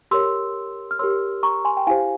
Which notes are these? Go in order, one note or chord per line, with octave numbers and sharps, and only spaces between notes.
G4 A#4 C#5 C6 E6
F6
G4 A#4 C#5 C6 E6
A#5 C#6
G#5 C6
G5
E4 G4 C5 F5 G#5